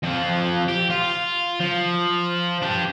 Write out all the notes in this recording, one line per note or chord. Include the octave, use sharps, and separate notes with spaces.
F2 F3
G4
F4
F3
D4 G4